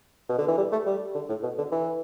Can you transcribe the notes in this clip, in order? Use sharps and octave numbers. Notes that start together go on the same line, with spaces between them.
B2
D3
E3
G3
A3
G3
D3
A2
B2
D3
E3